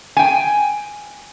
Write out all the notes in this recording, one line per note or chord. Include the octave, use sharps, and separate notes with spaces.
G5 G#5